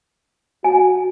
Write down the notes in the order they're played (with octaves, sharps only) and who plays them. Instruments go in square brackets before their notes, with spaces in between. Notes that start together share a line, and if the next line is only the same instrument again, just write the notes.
[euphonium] F#4 [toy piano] G#5